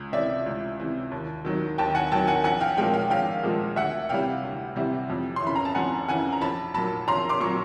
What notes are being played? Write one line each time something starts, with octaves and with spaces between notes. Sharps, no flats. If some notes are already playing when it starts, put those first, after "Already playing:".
Already playing: C#2
C3 E3 D5 E5
C#2
C3 E3
D#2
D#3 F#3
D#2 G5 A5
F#5 G#5
D#3 F#3 G5 A5
F#5 G#5
A#1 F#5 G#5
F5 G5
A#2 F3 G#3 F5 G5
F5 G5
A#1 F5 G5
A#2 F3 G#3
D2 E5 F#5
C3 E3 G3 F5 G5
D2
C3 E3 G3
F2
C6
C#3 E3 B5
A#5
A5
F2 F#5 G#5
C#3 E3 F#5 G#5
A#5
A#1 A5 B5
A#2 F#3 A5 B5
A#1 A#5 C6
C6 D6
A#2 F#3 C#6